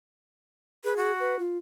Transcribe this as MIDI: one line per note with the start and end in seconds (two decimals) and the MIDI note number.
0.84 1.12 68
0.84 0.96 71
0.97 1.35 66
1.20 1.39 71
1.39 1.58 65